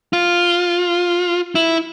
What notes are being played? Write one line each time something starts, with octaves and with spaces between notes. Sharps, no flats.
F4
E4